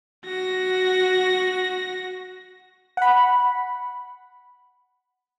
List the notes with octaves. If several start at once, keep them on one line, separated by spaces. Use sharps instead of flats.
F#4 A#6
F#5 B5